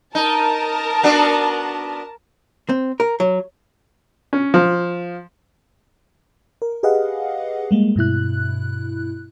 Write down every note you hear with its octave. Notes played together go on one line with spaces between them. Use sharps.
D#4 A#4 A5
B3 D4 F#4
C4
A#4
F#3
C#4
F3
A#4
G4 G#4 B4 D#5 F5 F#5
G3 G#3 A#3
G2 B2 E4 F#6